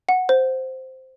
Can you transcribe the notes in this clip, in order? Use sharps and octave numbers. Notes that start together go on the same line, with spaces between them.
F#5
C5